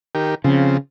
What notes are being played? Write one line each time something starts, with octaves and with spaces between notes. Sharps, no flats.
D#3 G4 A#4
C#3 F3 C4